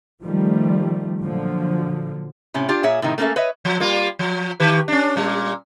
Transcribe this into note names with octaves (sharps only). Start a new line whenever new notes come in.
D#3 F3 G3 A3
A#2 D3 F3 F#3
A2 C3 C#4
D4 F4 G4 D5
A#2 G#4 C#5 E5
A2 C3 D#3 D#4
A3 A#3 C#4 G#4 A4 E5
B4 C#5 D#5 E5
F3
G3 A#3 F4
F3
D#3 G4 B4
C#4 D4
A#2 G3